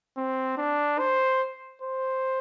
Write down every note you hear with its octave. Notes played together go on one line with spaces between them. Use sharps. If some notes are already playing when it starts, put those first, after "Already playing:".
C4
D4
C5
C5